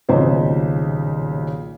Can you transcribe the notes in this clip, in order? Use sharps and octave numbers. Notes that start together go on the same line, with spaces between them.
D#1 B1 A#2 C#3 C5 D#5